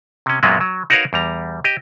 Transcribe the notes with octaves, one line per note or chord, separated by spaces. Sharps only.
C3 C#4
F#2 A#2 F#3 G#3 A#3 B3
F#3
D#4 F#4 A#4 B4 C#5 F5
E2 G3 A#5
G4 D#5